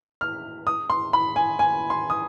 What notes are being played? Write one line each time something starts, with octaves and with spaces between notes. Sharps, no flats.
F6
D#6
C6
B5
G#5
G#5
C6
D#6